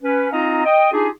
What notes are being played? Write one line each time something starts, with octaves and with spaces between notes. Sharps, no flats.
C#4 B4
C4 D#4 F4 D#5 F5 A#5
D#5 G5
D4 D#4 F4 G4 G#4